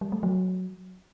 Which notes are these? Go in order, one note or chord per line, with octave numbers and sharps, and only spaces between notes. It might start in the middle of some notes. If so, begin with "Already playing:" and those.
G3
A3
F#3